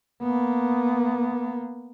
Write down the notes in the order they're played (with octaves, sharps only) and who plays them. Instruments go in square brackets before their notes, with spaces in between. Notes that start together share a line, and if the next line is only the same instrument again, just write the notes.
[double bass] A#3 B3